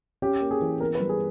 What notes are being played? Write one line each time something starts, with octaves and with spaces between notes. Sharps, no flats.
C#4 G4
A#3
G#4
E3
B3 A#4
B4
G3
G#4